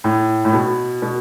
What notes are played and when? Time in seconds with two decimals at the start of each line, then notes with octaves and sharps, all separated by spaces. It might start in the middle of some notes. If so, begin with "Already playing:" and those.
0.04 A2
0.45 A2
0.53 B2
1.02 B2